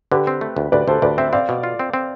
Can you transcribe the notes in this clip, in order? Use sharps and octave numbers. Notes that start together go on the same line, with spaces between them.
D3 G4 B4
C4
A3
D2
D2 B4 D5
D2 A4 C5
D2 B4 D5
C4 C5 E5
C4 D5 F5
B2
F4
C4
C4